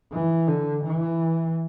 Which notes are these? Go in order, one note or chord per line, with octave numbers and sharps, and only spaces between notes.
E3
D3
E3